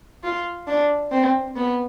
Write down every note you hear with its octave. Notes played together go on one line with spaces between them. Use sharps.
F4
D4
C4
B3